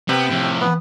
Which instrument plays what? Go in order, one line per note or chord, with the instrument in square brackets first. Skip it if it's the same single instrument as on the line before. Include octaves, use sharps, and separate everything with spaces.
[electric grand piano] C3 [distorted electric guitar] B3 [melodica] G5
[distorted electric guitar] A2 F3
[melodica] B3 B4